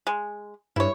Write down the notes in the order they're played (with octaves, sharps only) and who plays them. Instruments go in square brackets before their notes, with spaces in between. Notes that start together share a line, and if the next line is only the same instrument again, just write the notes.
[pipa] G#3
[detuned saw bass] G2 [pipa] E4 C#5